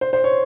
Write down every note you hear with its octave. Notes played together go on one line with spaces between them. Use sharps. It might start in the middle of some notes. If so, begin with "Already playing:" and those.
C5
C5
C#5